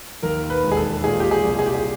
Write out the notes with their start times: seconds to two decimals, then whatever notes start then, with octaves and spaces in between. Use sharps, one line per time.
0.23 D#2 A#4
0.50 B4
0.63 E1
0.72 G#4
0.77 A4
1.04 A#2 G#4
1.20 G4
1.31 G#4
1.44 C2
1.59 G#4
1.66 G4
1.74 G#4